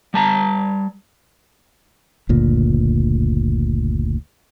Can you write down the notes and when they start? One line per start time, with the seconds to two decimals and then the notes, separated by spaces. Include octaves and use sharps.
0.14 G3 A5 A#5
2.29 F#1 D2 A#2